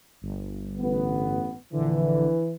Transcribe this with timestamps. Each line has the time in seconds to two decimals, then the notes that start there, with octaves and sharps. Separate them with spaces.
0.22 G1
0.79 A1 B3
1.72 A#1 D3 E3